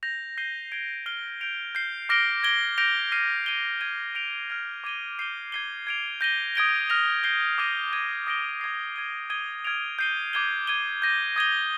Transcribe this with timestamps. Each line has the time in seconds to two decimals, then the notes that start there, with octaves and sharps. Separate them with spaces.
0.03 G6 A#6 F7
0.38 G6 C7 D#7 G7
0.72 G#6 D7 G7
1.06 F6 C7 G7
1.41 G6 D7 F7
1.75 G6 C7 G7
2.09 D6 F6 A#6 D7 G7
2.43 G#6 D7 G7
2.78 G6 A#6 D7 F7
3.12 F6 C7 D#7 G7
3.46 G#6 D#7 G7
3.81 G#6 D#7 G7
4.15 G6 D7 F7
4.50 F6 G#6 D7 F7
4.84 D6 G#6 D#7 G7
5.19 G6 C7 D#7 G7
5.52 G#6 C7 D#7 G7
5.87 G#6 D7 F7
6.21 G6 A#6 D#7 G7
6.55 D#6 G#6 D7 G7
6.90 F6 A#6 F7
7.24 G6 C7 G7
7.58 D6 F6 A#6 D#7
7.93 G#6 D#7 G7
8.27 D#6 A#6 D7 G7
8.61 D6 G#6 C7
8.96 G#6 D#7 G7
9.30 D#6 G#6 D#7 G7
9.65 F6 G#6 D7 F7
9.99 G6 C7 D#7 G7
10.33 D6 G#6 D#7 G7
10.67 G#6 D#7 G7
11.02 G6 A#6 D#7
11.36 D#6 G#6 D#7 G7